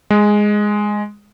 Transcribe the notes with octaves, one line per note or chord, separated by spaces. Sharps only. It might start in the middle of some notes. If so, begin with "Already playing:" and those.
G#3